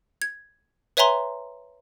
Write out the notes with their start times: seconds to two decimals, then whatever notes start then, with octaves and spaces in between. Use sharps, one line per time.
0.22 G#6
0.97 B4 C#5 E5 G#5 A#5 C6